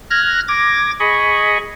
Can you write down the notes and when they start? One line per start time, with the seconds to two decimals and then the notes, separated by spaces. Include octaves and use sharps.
0.10 F6 F#6 G#6 A#6
0.48 D6 G#6 A#6
1.00 G#4 D#5 B5 C#6